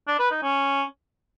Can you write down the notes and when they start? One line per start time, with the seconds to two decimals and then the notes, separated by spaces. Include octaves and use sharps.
0.07 D4
0.19 B4
0.31 D#4
0.42 C#4